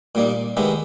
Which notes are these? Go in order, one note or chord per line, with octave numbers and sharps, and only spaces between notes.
A#2 G3 A#3 D#4
D#3 G#3 B3 E4 G4